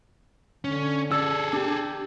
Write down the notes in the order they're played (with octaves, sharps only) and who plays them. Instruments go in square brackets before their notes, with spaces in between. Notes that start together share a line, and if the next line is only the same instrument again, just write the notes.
[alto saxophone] D3 [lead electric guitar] C#4
[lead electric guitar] G#4 A4 [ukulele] D5 [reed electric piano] E6
[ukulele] D4 [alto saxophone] G4